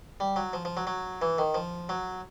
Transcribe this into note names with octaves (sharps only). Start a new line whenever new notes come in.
G3
F#3
F3
F3
F#3
F#3
E3
D#3
F3
F#3